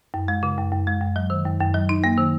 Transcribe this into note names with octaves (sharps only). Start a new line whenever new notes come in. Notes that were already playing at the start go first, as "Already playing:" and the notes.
F#2
G#3
C#3
F#2
F#2
G#3
F#2
F#3
D#3
F#2
F#2
F#3
D#4
A#3
D#3